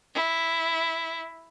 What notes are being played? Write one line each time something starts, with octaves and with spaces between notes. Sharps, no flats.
E4